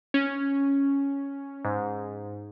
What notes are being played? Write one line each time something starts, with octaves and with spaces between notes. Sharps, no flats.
C#4
G#2